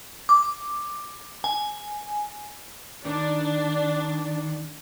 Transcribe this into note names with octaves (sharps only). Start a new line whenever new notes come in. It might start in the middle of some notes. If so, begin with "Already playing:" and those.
D6
G#5
D#3 D4